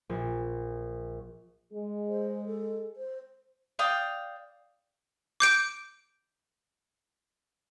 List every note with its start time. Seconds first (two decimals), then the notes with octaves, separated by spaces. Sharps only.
0.10 A#1
1.73 G#3 G#4
2.08 C5
2.46 A4
2.96 C5
3.79 D5 F5 G5 D#6
5.40 D6 G6 D7